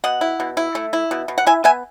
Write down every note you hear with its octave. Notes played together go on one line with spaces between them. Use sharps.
B2 D#5 F#5
E4
B2
E4
A3
E4
B2
B2
F#5
E4 E5 G#5
B3 E5 G#5